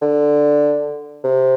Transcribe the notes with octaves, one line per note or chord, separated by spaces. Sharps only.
D3
C3